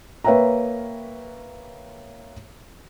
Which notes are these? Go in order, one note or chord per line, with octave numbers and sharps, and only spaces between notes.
A#3 B4 C#5 E5 G5 A#5